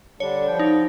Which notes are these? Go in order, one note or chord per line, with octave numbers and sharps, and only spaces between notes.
D3 G3 D4 C#5
F3 G5
D#4